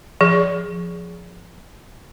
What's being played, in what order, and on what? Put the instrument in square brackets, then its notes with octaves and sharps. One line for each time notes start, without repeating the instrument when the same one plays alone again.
[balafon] F3 G#4